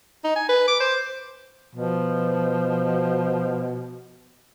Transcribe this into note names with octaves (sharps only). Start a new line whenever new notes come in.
D#4
G#5
B4
D6
C5
B2 F3